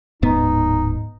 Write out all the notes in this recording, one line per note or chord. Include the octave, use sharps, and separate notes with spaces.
D1 G#2 B3 D#4